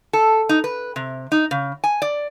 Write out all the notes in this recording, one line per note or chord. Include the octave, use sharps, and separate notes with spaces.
A4
D#4
B4
C3
D#4
C#3
G#5
D5